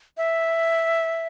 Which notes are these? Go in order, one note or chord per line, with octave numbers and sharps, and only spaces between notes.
E5